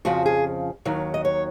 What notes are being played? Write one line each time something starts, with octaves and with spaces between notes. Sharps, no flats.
F2 C#3 F3 F#4
G#4
D#2 D#3 F#3
D#5
C#5